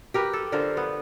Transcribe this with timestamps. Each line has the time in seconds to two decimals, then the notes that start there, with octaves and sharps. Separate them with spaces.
0.14 G4 A#4 B4
0.33 A4
0.52 D3 F4 A#4 C5
0.77 B3